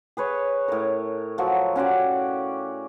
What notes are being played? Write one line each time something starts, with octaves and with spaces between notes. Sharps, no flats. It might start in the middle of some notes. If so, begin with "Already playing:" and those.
G#4 B4 C#5
A2 A#4
F3 F#3 F4
C#4 F#4 G4 D5